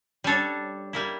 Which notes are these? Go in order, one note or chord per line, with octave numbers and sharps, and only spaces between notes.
G3 D4 A4 C#5
G3 A#3 E4